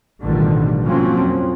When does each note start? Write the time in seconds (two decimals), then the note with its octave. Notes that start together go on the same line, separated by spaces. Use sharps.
0.23 A1 B2 D3 D#3 F3 G3
0.85 G#2 F3 F#3 A#3 C4 C#4
1.21 F2